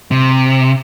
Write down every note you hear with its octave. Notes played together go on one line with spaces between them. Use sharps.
C3